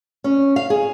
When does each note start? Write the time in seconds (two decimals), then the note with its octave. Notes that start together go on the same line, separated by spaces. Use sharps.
0.24 C#4
0.56 F5
0.70 G#4